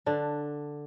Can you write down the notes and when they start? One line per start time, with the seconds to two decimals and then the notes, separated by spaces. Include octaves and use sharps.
0.06 D3 D4